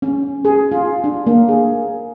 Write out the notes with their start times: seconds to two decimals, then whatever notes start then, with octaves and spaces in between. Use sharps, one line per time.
0.02 C#4
0.45 G#4
0.72 F4
1.04 D4
1.27 A#3
1.49 G#4